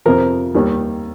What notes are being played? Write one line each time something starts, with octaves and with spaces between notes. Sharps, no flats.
F2 C3 F3 A#4
D#2 D#3 G3